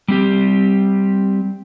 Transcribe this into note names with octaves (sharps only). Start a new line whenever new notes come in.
G3 C4 G4